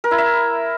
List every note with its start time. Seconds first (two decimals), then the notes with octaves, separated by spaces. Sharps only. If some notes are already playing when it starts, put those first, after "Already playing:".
0.04 A#4
0.11 E4
0.18 E5